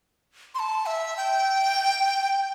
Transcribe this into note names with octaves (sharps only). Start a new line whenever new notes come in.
C6
A5
E5
G5